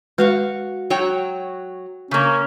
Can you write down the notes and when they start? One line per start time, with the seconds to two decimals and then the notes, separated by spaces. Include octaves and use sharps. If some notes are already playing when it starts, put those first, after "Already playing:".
0.18 G#3 F#4 B4 F5 C#6
0.90 F#3 F#4 C#5 G5
2.11 C#3 A#3 C#4